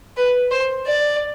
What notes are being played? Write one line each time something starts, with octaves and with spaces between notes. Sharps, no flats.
B4
C5
D5